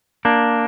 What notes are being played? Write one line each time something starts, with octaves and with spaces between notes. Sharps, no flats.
A#3 D4